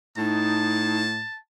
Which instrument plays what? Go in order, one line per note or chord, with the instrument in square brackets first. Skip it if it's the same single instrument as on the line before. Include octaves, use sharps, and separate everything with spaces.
[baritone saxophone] A2 [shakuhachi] D#4 [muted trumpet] A5